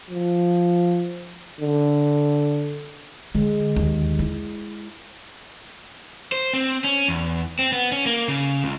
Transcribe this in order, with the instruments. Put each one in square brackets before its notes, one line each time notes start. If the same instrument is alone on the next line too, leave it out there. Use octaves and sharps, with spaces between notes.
[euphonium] F3
D3
[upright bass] D3 [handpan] G#3
[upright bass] D#2
E4
[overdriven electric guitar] C5
C4
C#4
E2
C4
B3
C#4
A#3
C#3
C#2